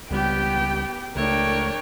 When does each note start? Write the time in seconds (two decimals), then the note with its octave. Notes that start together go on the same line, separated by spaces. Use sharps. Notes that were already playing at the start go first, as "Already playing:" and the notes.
0.11 C#2 G3 B3 G4 G5
1.16 C#2 A3 D4 A#4 C#5 G5